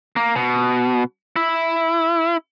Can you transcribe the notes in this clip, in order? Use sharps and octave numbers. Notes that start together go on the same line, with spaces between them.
A#3
B2
E4